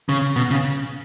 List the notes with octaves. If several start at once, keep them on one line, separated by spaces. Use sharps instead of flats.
C#3
B2
C#3